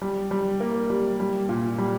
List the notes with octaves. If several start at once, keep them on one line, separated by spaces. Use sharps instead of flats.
G3
G3
A#3
G3
G3
A#2
G3